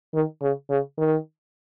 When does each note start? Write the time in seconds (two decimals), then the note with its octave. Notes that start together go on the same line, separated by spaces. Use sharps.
0.14 D#3
0.42 C#3
0.70 C#3
0.98 D#3